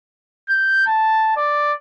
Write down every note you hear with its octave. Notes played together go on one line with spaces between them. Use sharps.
G6
A5
D5